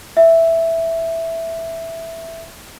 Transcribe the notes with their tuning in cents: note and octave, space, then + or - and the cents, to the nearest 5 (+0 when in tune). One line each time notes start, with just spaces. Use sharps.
E5 +0